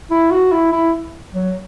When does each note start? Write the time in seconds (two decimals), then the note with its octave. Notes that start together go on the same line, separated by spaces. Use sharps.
0.11 E4
0.31 F#4
0.52 E4
0.72 E4
1.35 F#3